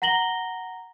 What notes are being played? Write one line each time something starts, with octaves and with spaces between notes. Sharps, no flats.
F#5 A#5 A#6 F#7 G7